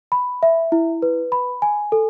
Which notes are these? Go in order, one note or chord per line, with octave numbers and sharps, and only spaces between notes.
B5
E5
E4
B4
B5
G#5
A4